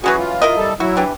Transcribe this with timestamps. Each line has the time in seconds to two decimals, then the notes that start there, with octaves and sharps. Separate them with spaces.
0.04 E3 F#3 C#4 F#4 G#4
0.18 F4
0.42 E4 A#4 D#5
0.57 G3 A4
0.80 F#3 E4 F#4
0.97 E3 D4 G4